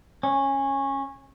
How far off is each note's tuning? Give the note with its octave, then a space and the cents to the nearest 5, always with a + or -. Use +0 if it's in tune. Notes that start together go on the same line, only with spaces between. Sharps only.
C#4 -15